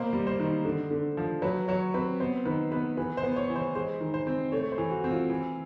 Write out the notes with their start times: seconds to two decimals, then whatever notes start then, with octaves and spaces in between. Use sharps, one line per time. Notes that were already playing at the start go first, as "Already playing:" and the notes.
Already playing: B2 A#3 C5
0.13 G3
0.27 C5
0.40 D#3
0.65 D3
0.91 D3
1.17 F3
1.42 F#3 B4
1.68 F#3 C#5
1.94 C4 B4
2.20 B3 C5
2.45 D#3 B4
2.72 B3 B4
2.97 E3 B4
3.17 C5
3.23 B3
3.36 C#5
3.50 E3
3.56 C5
3.75 G#3 C5
4.01 D#3
4.14 C5
4.27 C4
4.52 A3 C#5
4.72 C5
4.78 E3
4.91 F#4
5.04 C4
5.11 F4
5.30 E3